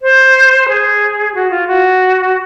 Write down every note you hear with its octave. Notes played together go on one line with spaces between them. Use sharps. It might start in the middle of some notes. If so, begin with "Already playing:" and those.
C5
G#4
F#4
F4
F#4